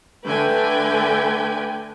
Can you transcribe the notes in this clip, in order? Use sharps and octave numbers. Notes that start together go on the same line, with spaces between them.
D3 A3 B4 G5 G#5